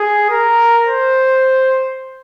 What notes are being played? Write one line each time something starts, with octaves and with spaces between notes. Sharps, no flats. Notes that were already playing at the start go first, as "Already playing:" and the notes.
Already playing: G#4
A#4
C5